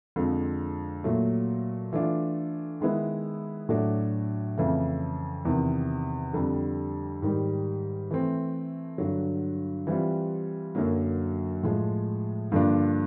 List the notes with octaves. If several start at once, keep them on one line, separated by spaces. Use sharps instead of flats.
F2 D3 F3 G#3
A#2 F#3 A3
E3 A3 D4 F4
D#3 G#3 B3 E4
A2 F#3 A3 D4 F#4
F2 C#3 E3 A3
E2 C3 D#3
F2 D3 G3
G#2 D#3 G3
E3 A3 C4
G2 D3 F#3
E3 G3 C4 F4
F#2 D3 F#3 A#3
A2 F3 G#3
G2 D3 F3 A#3 D4